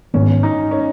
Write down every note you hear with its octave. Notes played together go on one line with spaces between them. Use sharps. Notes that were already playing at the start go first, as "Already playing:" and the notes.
G#2 D#3 G#3 B3 C#4
D#4
C#4